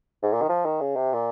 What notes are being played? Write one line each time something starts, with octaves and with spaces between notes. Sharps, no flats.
G#2
A#2
D#3
F3
D#3
C#3
C3
A#2